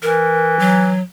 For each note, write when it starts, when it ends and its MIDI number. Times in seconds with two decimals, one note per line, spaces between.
0.02 0.98 52
0.02 0.57 70
0.59 1.02 54